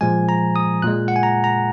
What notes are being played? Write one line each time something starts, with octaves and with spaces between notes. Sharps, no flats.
A#2 F3 G#3 G#5
A#5
D#6
A#2 G#3 F#6
F#5
G#5
A#5
A#5